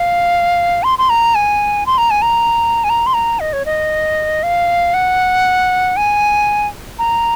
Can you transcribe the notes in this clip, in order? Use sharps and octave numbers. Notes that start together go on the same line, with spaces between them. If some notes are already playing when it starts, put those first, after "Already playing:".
Already playing: F5
C6
C6
A#5
G#5
C6
A#5
G#5
A#5
G#5
A#5
C6
A#5
D#5
C#5
D#5
F5
F#5
G#5
A#5